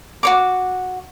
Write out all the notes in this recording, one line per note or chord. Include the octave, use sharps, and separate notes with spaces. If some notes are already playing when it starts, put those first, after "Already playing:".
F#4 C#5 D6